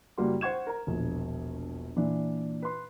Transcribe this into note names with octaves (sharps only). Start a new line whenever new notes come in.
F#1 G3 A#3 F#4 C6
C5 F#5 C#6 G#6 E7
A#4 A#5
E1 A#1
A#2 E3 D4
B4 C6